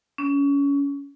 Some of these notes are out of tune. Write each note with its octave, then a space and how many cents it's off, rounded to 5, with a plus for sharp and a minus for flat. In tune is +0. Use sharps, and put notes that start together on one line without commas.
C#4 +25